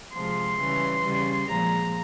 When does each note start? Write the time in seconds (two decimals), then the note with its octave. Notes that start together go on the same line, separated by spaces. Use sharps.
0.14 C3 F3 G#3 C6
0.59 C#3 E3 G3
1.03 C#3 G3
1.47 A#2 F3 G#3 A#5